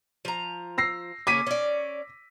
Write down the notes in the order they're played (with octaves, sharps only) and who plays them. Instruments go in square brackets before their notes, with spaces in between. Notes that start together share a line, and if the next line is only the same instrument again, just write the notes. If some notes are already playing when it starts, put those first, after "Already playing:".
[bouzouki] F3 A#5
[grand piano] E6 A#6 C7
[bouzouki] C#3 A#3 C#4 [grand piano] D6 B6 D#7
[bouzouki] C#4 D5